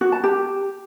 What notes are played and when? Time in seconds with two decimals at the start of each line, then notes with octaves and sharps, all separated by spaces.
0.01 F#4
0.12 A5
0.24 G4